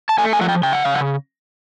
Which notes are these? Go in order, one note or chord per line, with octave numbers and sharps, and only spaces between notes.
A5
A3 G#5
G#5
F3 F#5
G5
C#3 G5
F#5
C#3 F5
F#5